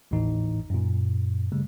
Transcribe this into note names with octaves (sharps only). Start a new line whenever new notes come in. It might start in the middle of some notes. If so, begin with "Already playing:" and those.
G#1 D#2 A2 E3 D#4
F#2 A#2
C#3 G3 A3